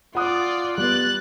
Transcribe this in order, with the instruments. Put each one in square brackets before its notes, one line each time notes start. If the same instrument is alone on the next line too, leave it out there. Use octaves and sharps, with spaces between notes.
[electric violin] F4 D5 [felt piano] F#5 D#6 F#6
[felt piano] G3 B3 B4 [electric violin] F#6 A6